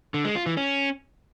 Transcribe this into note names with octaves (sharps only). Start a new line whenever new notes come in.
D3
G#3
F4
E3
C#4